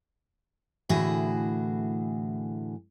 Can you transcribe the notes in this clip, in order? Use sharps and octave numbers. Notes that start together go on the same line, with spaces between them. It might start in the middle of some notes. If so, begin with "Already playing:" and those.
A2 D3 E3 F#4 G#4